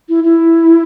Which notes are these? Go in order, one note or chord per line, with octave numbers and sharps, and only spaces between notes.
E4
E4